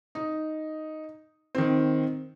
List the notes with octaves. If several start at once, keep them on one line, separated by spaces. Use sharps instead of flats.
D#4
D#3 C4